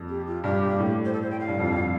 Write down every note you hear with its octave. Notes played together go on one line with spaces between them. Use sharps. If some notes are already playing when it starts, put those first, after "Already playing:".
Already playing: F2
G4
F4
G2 G4
G2
A2
C5
A4
C5
G5
F5
G2
F2
F2